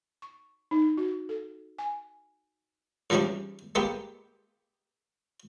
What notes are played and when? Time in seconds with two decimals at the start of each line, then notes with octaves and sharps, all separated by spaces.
0.22 C#6
0.71 D#4
0.98 F#4
1.29 A4
1.79 G#5
3.10 G#2 E3 F3 G3 C#4 D4
3.75 G#3 A#3 B3 G4